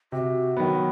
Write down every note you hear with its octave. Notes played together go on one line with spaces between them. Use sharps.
C3 F#4
D#3 F#3 B3